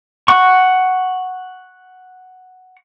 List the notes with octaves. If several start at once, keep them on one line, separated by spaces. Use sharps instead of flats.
F#5 C#6